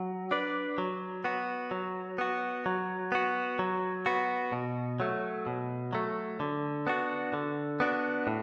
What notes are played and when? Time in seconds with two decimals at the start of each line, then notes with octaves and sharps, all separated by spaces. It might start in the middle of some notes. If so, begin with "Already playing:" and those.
Already playing: F#3
0.31 D4 B4 D5
0.78 F#3
1.24 B3 F#4
1.71 F#3
2.18 B3 F#4
2.66 F#3
3.12 B3 F#4
3.59 F#3
4.06 B3 F#4
4.52 B2
5.00 F#3 A3
5.47 B2
5.93 F#3 A3
6.40 D3
6.87 B3 D4 F#4
7.34 D3
7.80 B3 D4 F#4
8.27 A2